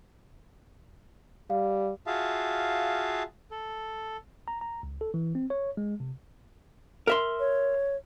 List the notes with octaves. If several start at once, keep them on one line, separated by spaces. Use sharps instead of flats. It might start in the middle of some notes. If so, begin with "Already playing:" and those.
G3 F5
F4 F#4 G#4 E5 F5 A5
A4
A#5
A#5
C#2
A4
E3
C4
C#5
G#3
C3
A#4 E5 C6
C#5